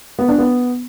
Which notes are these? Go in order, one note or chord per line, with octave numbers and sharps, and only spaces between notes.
B3
D4
B3